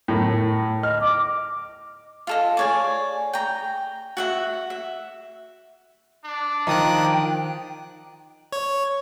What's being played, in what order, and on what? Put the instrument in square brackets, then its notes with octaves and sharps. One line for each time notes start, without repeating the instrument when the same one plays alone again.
[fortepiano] A2 A#4
[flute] D#5 [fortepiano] F6
[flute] D6
[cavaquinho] F4 A4 D#5
G#4 C#5 D5
G5 A#5
F#4 E5 F#5
E5
[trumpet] D4
[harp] D#3 [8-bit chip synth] F3 D#6 F#6 [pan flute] G5
[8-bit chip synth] C#5